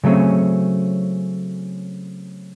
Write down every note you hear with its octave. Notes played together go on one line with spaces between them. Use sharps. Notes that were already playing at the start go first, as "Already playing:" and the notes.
C#3 F#3 A3 C4 C#4